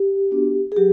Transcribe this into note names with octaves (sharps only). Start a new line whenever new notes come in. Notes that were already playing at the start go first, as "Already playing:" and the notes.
Already playing: G4
B3 D4 F#4
G#4
F#3 G4